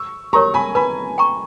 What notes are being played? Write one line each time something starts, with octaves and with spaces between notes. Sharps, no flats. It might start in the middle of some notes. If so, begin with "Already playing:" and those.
Already playing: C#6 E6
G4 A#4 C#5 A#5 C#6
G#5 B5
B4 G#5 B5
G5 A#5 C#6